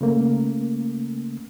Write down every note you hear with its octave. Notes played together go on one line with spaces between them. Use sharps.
C#3 A3 A#3